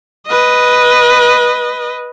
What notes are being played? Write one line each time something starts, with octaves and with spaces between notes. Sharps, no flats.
B4 D#5